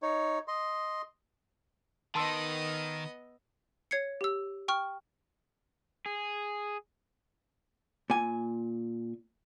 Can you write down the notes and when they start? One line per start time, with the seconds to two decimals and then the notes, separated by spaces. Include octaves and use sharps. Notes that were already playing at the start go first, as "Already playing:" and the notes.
0.02 D#4 C#5
0.48 D#5 C6
2.15 D#3 B3 D#5 A5 C6 E6
3.91 C#5 G#6 C7 C#7
4.21 G4 E6
4.68 G5 C#6 F6
6.06 G#4
8.10 A#2 G#5